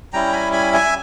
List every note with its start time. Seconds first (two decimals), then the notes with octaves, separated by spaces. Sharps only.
0.13 G3 C#4 E4 G5 A#5
0.33 G#5 B5
0.53 G#5 B5
0.73 E5 G#5